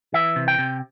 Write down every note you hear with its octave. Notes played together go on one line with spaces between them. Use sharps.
E3 E5
C3
G5
C3